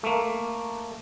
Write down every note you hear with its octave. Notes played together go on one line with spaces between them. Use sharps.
A3 A#3